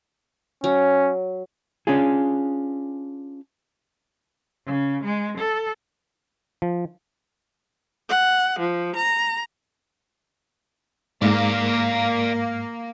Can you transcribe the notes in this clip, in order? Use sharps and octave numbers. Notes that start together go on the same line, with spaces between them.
F#3 C#4
C#4 D4 F4 G#4
C#3
G#3
A4
F3
F#5
F3
A#5
G#2 A#3 D5 F5